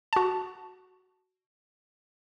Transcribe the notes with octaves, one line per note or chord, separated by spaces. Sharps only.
F#4 A5